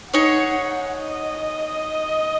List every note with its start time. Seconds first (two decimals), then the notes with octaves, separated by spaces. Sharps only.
0.13 D#4 G#4 C#5 F#5
1.00 D#5